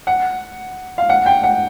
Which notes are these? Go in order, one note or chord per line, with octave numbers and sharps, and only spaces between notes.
F#5
F5
F#5
G5
F#5